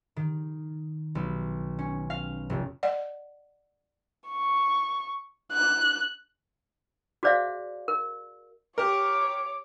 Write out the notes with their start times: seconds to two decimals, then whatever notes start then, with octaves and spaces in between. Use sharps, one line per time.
0.16 D#3
1.15 B1
1.79 C#4
2.10 F5
2.50 F1
2.83 D5 D#5 F#5
4.29 C#6
5.52 F#6
7.23 F#4 G#4 C5 D5 E5 F5
7.88 A#4
8.78 G4 A#4 C#5 D6